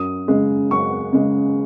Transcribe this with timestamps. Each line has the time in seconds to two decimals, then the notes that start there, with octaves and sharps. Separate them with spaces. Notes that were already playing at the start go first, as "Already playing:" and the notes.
Already playing: F#2 D#6
0.28 C#3 G#3
0.71 F#2 C#6
1.13 C#3 G#3